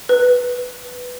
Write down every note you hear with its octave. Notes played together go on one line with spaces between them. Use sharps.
B4